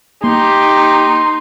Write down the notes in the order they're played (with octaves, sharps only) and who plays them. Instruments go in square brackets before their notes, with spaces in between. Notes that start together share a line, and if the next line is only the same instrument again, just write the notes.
[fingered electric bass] A#3 [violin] D#4 [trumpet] G4 [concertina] C6